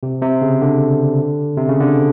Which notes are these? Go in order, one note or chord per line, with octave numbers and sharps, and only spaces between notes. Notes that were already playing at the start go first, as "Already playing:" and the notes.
C3
C3
C#3
D3
C3
C#3
D3